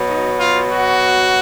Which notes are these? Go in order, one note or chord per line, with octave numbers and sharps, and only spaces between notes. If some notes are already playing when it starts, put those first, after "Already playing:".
Already playing: B2 F#3
D#4
F4
F#4